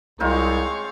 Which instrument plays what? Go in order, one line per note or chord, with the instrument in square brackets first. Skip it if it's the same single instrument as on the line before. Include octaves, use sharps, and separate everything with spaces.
[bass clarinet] C2 [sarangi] G#3 [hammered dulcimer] C4 D#4 F4 [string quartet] C#5 F5 C#6